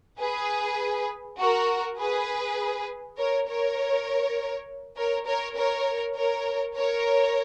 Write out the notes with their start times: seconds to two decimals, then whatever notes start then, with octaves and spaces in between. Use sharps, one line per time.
0.20 G#4 B4
1.39 F#4 A#4
1.99 G#4 B4
3.18 A#4 C#5
3.48 A#4 C#5
4.97 A#4 C#5
5.26 A#4 C#5
5.56 A#4 C#5
6.16 A#4 C#5
6.75 A#4 C#5